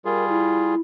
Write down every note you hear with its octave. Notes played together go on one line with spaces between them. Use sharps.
G3 F4 G#4 A#4
E4